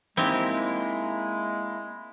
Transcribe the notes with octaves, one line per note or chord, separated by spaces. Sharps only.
G#3 A#3 C4 D#4 E4 G4